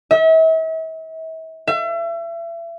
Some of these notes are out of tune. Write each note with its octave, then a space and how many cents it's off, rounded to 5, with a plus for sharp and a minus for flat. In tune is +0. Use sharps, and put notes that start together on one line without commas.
E5 -40
E5 +35